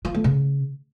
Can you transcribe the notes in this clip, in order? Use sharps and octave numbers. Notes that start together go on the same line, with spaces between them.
F4
A3
C#3